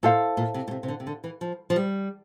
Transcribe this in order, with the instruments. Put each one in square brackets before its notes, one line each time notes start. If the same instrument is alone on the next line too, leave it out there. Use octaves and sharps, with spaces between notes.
[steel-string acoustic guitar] A#2 [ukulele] E4 A4 C5 F5
[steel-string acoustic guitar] A#2
C3
A#2
C3
C3
D3
C3
D3
E3
F3
F3
G3